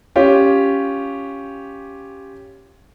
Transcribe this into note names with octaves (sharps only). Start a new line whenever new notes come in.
C#4 F4 G4